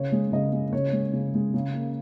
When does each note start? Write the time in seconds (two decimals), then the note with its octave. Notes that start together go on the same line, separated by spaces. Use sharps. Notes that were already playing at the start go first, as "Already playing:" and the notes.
Already playing: C#3 C#5
0.12 G#3
0.32 C#3 D#5
0.53 G#3
0.73 C#3 C#5
0.93 G#3
1.13 C#3
1.34 G#3
1.54 C#3
1.74 A#3